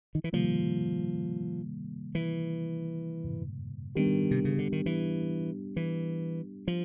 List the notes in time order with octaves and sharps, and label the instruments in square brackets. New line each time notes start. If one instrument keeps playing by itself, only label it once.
[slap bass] D#3
E3
[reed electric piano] C3 D#3 G3 A#3 [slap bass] F3
[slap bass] E3
[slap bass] D#3 [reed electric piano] G3 B3 D4 G4
[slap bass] C3
C#3
D3
D#3
E3
E3
F3